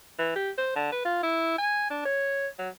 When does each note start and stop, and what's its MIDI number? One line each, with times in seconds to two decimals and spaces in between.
0.19 0.31 52
0.36 0.50 67
0.58 0.73 72
0.76 0.90 50
0.92 1.04 71
1.05 1.20 65
1.22 1.57 64
1.58 1.89 80
1.90 2.01 62
2.05 2.47 73
2.58 2.69 54